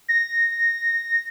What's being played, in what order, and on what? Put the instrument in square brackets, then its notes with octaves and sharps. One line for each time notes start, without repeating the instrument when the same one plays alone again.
[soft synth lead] A#6